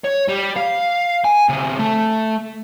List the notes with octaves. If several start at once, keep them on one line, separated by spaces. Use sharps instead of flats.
C#5
G3
F5
G#5
C#3 C4
A3 A4